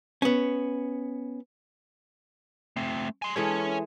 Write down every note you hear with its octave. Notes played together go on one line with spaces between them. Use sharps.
B3 C#4
A3 C4
G#5 C6
E3 G#3 A4 C#5 G#5